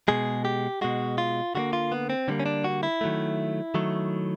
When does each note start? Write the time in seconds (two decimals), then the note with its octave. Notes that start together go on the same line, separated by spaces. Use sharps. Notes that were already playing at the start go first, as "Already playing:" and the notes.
0.08 B2 G#3 G#4
0.45 G4
0.81 B2 G#3 F#4
1.18 F4
1.55 D3 G3 A#3 F#4
1.73 F4
1.92 B3
2.10 C4
2.28 D3 G3 A#3 C#4
2.40 C#4
2.46 D4
2.64 F#4
2.83 E4
3.01 D#3 F#3 A3
3.74 D#3 F#3 A3